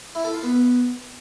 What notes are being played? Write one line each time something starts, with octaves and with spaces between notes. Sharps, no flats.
E4
A4
F4
B3